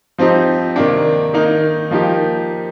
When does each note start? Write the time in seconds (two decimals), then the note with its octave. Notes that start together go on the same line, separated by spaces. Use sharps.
0.18 F3 C4 D#4 G4
0.76 C3 D#3 A#3 D4
1.34 D#3 A#3 D#4
1.91 F3 A#3 D#4 G4